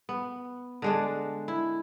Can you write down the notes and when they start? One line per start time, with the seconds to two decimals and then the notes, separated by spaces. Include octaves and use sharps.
0.09 B3
0.82 D3 G#3 D4
1.48 E4